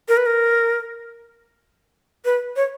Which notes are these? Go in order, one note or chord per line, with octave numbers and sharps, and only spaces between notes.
A#4
B4
A#4
B4
C#5